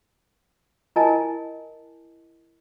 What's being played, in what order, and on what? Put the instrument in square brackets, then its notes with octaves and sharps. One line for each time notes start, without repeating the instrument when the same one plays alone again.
[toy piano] E4 A#4 D#5 G#5 A5